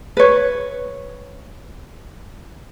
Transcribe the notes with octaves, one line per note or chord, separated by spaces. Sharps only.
B4 C#5